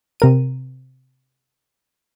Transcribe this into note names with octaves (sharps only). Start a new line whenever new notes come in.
C3 A#4 D#7